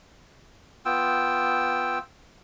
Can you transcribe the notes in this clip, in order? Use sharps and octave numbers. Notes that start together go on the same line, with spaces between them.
B3 F4 G5 E6